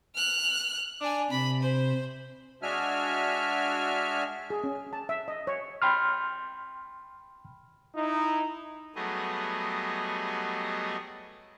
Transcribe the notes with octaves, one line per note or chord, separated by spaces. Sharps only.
F6 F#6
D4 D5 G#5
C3 B5
C5
G#3 D4 F#4 E5 G#5 F6
G#4
C#4
A5
E5
D#5
C#5
G5 B5 C6 F6
D#4 E4
F#3 G3 A3 B3 G#4 D#5